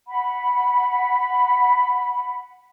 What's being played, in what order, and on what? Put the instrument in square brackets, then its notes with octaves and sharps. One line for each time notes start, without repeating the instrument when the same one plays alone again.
[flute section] F#5 B5